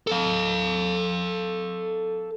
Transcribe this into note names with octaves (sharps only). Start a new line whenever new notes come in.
A4 F5